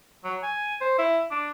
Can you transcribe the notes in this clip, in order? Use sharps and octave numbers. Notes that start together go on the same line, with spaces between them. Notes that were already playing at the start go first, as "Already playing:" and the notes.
F#3
G#5
C5
E4
D4